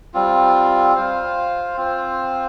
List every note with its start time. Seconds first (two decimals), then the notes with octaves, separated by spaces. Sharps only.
0.14 G3 C4 F4
0.95 F4 C5 F5
1.77 C4 F4 C5